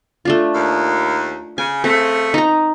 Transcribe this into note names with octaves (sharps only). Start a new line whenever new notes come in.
A3 D4 F4
D#2
C#3 G#5
C#3 A3 C4
D#4 A#5